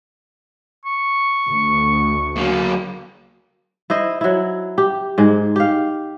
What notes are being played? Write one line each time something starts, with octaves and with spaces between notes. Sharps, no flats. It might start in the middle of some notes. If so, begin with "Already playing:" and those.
C#6
D2
F#3 A#3
E4 C5 D#5
F#3 E4
G4
G#2 G#3
G4 F5